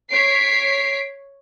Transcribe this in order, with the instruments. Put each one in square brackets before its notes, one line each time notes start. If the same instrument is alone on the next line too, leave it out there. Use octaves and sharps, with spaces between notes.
[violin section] C#5 B6 C7 D7